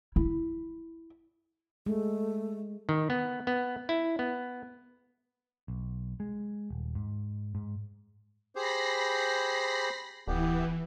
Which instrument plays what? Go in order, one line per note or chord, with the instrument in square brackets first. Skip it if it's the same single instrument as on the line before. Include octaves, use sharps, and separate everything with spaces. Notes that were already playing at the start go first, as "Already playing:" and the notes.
[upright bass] E4
[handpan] G#3 [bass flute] A3
[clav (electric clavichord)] D#3
B3
B3
E4
B3
[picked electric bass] B1
G#3
D#1
G#2
G#2
[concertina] G4 G#4 C5 [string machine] B5 A#6 C7
[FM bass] D1 [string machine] E3 [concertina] B3 G4